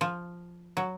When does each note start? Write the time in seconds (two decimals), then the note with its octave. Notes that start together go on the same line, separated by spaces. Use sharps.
0.01 F3
0.77 F#3